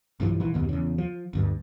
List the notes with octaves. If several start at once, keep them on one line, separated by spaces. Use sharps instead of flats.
B1 G2 E3 F3
A#1 E3
F#1 D#2 B2
E2 C#3
F3
G1 D2 G2